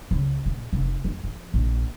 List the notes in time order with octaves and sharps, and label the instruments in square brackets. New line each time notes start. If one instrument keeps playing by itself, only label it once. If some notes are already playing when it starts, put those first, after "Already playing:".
[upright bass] C#2
A#2
F1
F2
F3
A#1